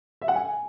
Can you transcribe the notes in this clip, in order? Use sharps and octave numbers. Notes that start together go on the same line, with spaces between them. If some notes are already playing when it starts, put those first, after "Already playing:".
E5
F#5
G#5